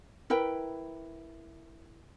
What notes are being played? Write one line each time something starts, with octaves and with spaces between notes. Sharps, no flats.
E4 A#4 B4 G5